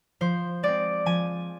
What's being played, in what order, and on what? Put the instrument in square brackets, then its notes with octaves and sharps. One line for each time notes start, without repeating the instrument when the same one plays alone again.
[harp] F3 C5
G#3 C4 D5
F3 G#5